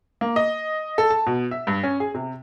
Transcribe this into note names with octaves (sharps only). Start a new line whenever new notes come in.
A#3
D#5
A4
A5
B2
E5
G2
C#4
G#4
C3